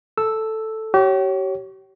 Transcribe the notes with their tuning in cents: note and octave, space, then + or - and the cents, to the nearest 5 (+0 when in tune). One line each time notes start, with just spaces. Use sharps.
A4 +0 E6 +0
G4 -40 C#5 -5